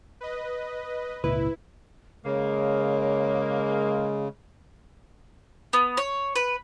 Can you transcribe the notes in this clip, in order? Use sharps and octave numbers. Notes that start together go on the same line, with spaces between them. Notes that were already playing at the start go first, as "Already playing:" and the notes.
B4 D#5
G#1 C#2 A#2 E4 B4
C#3 G#3 A#3 C#5
B3
C#5
B4